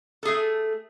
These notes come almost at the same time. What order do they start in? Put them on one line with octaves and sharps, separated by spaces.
A4 G#4 A3